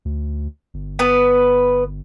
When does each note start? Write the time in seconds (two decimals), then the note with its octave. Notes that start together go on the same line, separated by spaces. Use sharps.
0.05 D2
0.74 G1
0.99 B3 B4